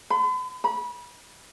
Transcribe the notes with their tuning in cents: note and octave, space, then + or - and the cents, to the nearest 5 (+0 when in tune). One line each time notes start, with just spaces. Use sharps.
B5 +45
B5 -25